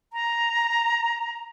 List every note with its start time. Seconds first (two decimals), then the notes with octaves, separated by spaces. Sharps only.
0.13 A#5